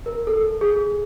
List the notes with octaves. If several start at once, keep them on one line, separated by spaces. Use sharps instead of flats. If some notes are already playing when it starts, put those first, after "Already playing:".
A#4
A4
G#4